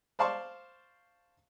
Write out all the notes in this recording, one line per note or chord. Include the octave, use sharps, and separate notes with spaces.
C5 D5 F5 A5 C6 C#6